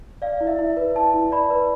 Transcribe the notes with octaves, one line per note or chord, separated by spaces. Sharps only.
D5 F5
E4
E5
E4
B4
E4 A5
E4
D5 B5
B4